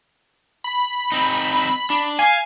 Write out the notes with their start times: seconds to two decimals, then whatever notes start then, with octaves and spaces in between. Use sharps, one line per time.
0.64 B5
1.12 C4 D#4
1.90 D4
2.19 F5 G#5